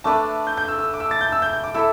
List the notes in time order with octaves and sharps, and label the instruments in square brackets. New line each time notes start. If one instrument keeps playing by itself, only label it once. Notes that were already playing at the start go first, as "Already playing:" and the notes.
[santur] A3 D4 B4 D5 [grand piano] A5
[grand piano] G6
G6
E6
E6
D6
E6
A6
G6
E6
G6
G6
D6
[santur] E4 A4 E5 [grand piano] E6